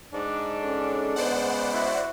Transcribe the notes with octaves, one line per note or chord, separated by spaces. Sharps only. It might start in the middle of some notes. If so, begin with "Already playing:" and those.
G#2 D4
C#4 A4
C#3 G#3 B3 C5 D5 F#5
E4 F#4